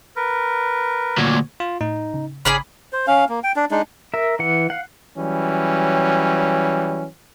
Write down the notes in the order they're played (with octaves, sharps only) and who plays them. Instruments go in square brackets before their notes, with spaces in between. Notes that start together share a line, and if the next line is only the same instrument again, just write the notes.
[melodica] A#4 B4
[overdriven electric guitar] D2 A#2 [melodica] C#5
[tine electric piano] F4
[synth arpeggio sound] A2 [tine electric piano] D#4
[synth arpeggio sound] C#3
[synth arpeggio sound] G#1 C#3 A#5 [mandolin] C#4 G#4 D5 [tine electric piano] B5
[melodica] C5
C#4 F5
A#3
G5
D4
G#3 D4 D#4
[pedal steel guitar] A#4 E5
E3 F#5
F5 F#5
[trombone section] E3 F#3 G3 C#4